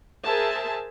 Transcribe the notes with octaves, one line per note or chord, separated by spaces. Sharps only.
G#4 A#4 C5 E5 G#5 A5